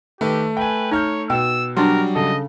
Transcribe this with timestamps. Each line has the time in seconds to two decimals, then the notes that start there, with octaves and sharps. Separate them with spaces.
0.21 D#3 A3 G4 B4
0.57 B4 G5 G#5
0.92 D#4 C#5 A#5 F6 G6
1.30 B2 G5 E6
1.77 F#3 G3 D4 A#4 C6
2.15 C#3 A4 D#5